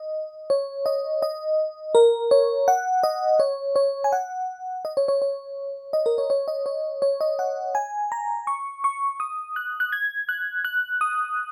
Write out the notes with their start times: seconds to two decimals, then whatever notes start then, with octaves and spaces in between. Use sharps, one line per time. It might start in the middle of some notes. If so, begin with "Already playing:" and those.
Already playing: D#5
0.50 C#5
0.86 D#5
1.22 D#5
1.95 A#4
2.31 C#5
2.68 F#5
3.03 D#5
3.40 C#5
3.76 C#5
4.04 G#5
4.12 F#5
4.85 D#5
4.97 C#5
5.08 C#5
5.22 C#5
5.93 D#5
6.06 A#4
6.18 C#5
6.30 C#5
6.48 D#5
6.66 C#5
7.02 C#5
7.21 D#5
7.39 F#5
7.75 G#5
8.12 A#5
8.47 C#6
8.84 C#6
9.20 D#6
9.56 F#6
9.80 F#6
9.92 G#6
10.29 F#6
10.65 F#6
11.01 D#6